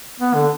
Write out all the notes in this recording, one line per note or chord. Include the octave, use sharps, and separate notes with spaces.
B3
D3